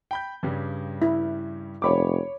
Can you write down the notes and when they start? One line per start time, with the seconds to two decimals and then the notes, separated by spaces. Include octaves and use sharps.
0.11 G5 B5 G6
0.43 G2 C#3 G3
1.02 E4
1.82 F1 C#5 B5 D6